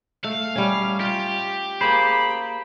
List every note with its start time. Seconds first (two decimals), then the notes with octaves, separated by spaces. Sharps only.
0.24 A3 F5
0.56 G3 C#4
1.00 F4 G4
1.81 A#3 G#4 C5 B5